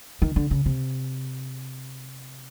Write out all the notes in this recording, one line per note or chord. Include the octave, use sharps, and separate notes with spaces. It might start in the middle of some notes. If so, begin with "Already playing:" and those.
D#3
D3
C#3
C3